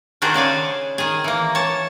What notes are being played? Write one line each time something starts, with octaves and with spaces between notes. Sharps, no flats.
D#3 D4 F#4 G#4 C5
C#3 D5 F5 G#5
D#3 G#4
E3 A#3
C#5 A5